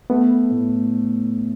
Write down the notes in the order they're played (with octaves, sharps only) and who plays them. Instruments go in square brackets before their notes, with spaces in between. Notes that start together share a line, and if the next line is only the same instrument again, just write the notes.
[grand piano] A3 [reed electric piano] B3
[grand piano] A2